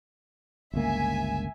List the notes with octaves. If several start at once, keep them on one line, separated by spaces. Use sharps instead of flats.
G1 C#2 A#3 E5 G#5